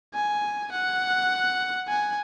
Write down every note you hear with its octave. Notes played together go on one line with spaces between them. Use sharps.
G#5
F#5
G#5